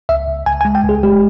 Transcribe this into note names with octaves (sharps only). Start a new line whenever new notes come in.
C#2 E5
C#2
C#2 G#5
G#5
G#3
G5
C#2
G#4
G#3 G4